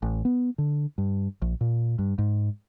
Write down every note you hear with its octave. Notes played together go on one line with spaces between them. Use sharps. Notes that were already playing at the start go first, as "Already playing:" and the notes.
A1
B3
D3
G2
A#1
A#2
G2
G#2